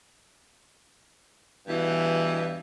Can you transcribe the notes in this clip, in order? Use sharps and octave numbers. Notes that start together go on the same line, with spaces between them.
E2 G2 B2 E3